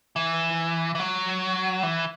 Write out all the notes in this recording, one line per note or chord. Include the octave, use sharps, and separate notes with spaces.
E3
E3
F#3
E3